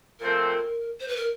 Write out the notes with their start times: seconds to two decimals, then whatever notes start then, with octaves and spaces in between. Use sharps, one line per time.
0.20 A#2 F3 A3 C4 A#4
1.00 C5
1.08 B4
1.16 A#4